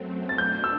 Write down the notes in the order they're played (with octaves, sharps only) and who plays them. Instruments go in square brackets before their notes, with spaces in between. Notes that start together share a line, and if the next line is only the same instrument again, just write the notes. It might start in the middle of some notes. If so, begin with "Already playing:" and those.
Already playing: [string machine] F#2 F#3 A3 C4
[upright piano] A6
[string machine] B2 A3 D4 [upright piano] G6
[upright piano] E6